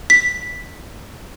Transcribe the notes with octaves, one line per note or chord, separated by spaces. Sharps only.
B6